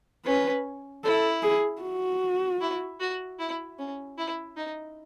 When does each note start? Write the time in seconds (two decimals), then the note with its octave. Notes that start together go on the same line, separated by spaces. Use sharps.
0.25 C#4 B4
1.04 E4 A4
1.43 G#4
1.82 F#4
2.61 E4
3.00 F#4
3.39 E4
3.79 C#4
4.18 E4
4.56 D#4